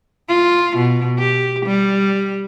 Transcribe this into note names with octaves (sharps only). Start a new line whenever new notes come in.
F4
B2
G4
G3